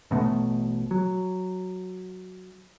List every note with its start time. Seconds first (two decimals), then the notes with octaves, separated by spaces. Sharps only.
0.11 A1 B2 A3
0.91 F#3